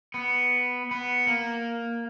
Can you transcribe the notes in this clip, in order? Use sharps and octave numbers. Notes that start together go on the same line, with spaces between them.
B3
B3
A#3